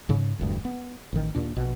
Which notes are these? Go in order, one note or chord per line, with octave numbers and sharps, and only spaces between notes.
G#2 C#3
E1 D2 G2
B3
A1 D#3
D#2 A#2 D4
A#1 B2